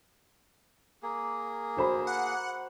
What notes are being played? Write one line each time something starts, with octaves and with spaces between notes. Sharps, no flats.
A#3 G#4
F#4 C5 B5
F#5